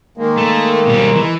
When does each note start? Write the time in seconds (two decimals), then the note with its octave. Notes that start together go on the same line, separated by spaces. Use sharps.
0.18 D#3 G#3 A#3
0.38 A3
0.87 B2 G3
1.16 E3